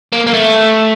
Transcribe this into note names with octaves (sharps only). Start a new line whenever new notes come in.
A#3
A#3
A3